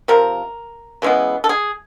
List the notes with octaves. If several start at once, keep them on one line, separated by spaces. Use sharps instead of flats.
C3 F3 A#4
C#3 E3 G#3 B3
A4
G#4